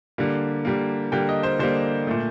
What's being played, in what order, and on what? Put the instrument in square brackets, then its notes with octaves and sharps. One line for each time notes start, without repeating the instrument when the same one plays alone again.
[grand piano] D3 G3 A#3
D3 G3 A#3
D3 G3 A#3 G5
D#5
C5
D3 G3 A#3 C5
A#2 A3